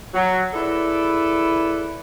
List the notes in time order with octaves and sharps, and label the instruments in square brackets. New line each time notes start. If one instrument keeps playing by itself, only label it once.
[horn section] F#3
E4 G#4 A4 B4 D5